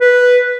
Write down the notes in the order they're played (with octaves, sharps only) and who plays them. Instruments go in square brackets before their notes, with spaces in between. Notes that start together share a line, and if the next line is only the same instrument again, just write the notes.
[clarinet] B4